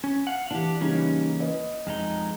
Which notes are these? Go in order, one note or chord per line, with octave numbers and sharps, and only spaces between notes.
C#4
F5 F#5
E3 D4 G4
C#3 E3 G3 A#3 C#4 D#4
B4 D#5
F2 G#3 D#4